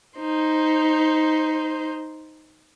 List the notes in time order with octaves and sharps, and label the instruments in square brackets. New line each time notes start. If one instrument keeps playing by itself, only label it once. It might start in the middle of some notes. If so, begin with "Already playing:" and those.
[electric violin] D#4 C5